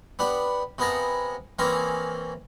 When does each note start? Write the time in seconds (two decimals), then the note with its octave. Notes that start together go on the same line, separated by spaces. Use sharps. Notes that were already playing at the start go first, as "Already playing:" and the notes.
0.19 B3 D4 G4
0.78 C3 B3 G#4 A#4 A5
1.59 E3 A#3 C4 C#4 G#4 A#4